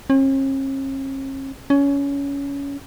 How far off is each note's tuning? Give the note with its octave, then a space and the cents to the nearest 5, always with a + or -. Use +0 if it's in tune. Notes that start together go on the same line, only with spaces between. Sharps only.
C#4 -45
C#4 +20